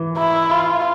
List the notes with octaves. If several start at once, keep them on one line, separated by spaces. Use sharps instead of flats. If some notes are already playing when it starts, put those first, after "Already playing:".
Already playing: E3
E4
F4